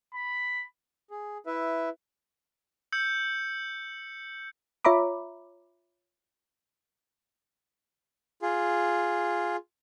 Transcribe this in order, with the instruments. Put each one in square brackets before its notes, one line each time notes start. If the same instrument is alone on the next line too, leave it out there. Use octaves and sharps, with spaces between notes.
[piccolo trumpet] B5
[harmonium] G#4
E4 B4 E5
[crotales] E6 G6 C#7
[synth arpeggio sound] F4 C#5 E5 A#5 B5 D6
[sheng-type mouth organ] F4 G#4